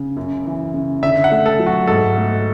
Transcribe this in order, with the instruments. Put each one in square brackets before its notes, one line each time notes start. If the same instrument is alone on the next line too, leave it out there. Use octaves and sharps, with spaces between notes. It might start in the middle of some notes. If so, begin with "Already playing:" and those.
Already playing: [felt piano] C#3
F#2
E3
C#3
[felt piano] D3 [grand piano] E5
[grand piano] F#5
[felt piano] A3
[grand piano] A4
[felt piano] F#3
[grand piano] F#4
[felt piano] G#2 [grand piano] A4
[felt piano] A3